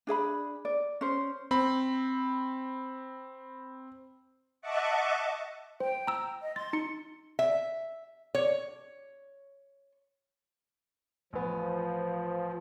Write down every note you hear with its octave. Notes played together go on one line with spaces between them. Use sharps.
D4 G#4 E5 B5
D5
C#4 C5
C4 B5
D#5 E5 F#5 A5 C#6 D6
C5 G5
A#5 E6
D#5
C6 A6
D#4 C#7
E5
C#5
A1 F3 B3